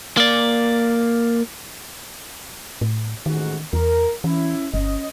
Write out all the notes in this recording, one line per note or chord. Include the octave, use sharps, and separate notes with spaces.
A#3 D5
A2
A1 G#2 D#3 F#4
E2 A#4
E3 C#4 E4
G1 C#4 D#5